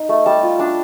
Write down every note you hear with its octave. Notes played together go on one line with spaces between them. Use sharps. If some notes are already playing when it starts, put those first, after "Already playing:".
Already playing: D#4
A3
G3 A5
F4
D4 A5